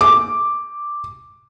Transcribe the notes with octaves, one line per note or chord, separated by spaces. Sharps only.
D6